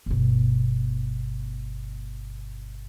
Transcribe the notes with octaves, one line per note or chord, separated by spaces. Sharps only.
G1 B2